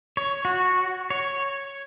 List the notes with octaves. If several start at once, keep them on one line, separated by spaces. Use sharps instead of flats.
C#5
F#4
C#5